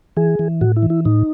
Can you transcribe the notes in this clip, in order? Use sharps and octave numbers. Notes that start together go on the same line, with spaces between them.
E3 G#4
E3
A2 F#4
E4
E3
E4
A2 D#4